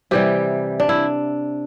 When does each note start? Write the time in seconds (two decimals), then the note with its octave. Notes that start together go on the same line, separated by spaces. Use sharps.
0.11 C3 E3 G3 G4
0.80 D4
0.89 E4